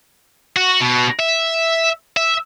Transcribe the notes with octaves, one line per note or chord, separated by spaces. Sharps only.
F#4
B2
E5
E5